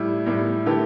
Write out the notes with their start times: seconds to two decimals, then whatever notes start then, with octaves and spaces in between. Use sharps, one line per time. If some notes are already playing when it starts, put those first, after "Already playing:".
Already playing: A2 G3 E4
0.26 A2 G3 E4
0.66 D3 A3 E4 G4 B4